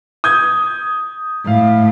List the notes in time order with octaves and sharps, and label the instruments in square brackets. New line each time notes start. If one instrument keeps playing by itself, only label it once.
[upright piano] D#6 G6 G#6
[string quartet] A2 [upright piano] F5